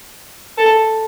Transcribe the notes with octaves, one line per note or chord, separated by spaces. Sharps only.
A4